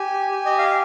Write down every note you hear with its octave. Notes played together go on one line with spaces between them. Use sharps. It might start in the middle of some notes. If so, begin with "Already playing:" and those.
Already playing: G4 G#5
G4
D#5
F5